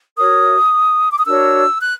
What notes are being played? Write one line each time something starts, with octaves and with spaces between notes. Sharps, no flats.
F#4 A#4 C#5 D#6
D6
D#6
D4 F#4 A#4 C#5 E6
F#6